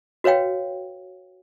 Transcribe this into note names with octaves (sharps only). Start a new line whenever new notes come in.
F#4 B4 C#5 F5 G5